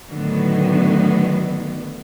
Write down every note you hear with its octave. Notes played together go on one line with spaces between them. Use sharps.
A2 D3 D#3 F#3 B3